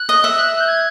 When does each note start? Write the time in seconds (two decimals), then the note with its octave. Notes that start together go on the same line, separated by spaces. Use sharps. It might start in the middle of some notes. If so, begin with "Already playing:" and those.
Already playing: F#6
0.09 D#5
0.24 E5
0.60 G6
0.67 G#6